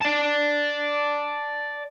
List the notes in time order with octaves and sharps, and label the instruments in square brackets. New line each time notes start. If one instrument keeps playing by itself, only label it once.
[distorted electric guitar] D5 A5